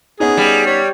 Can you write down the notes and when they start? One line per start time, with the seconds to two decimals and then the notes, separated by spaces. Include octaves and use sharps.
0.20 B3 C#4 D#4 G#4
0.37 G3
0.66 C#5